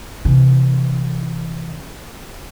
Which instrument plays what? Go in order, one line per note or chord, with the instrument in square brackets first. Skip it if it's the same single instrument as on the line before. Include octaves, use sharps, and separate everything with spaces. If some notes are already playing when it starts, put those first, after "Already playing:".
[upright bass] C3 E3